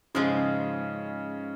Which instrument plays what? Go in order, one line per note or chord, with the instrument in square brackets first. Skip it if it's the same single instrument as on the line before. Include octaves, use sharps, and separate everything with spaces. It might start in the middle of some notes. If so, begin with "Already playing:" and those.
[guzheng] G#2 F3 G#3 [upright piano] C#3